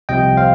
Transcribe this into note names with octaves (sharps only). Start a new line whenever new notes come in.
C2 C3 F3 D#5 G5
C5 F5